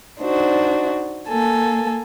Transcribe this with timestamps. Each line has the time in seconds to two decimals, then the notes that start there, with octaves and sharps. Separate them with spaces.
0.20 D4 D#4 F#4 C5
1.28 A#3 A4 G#5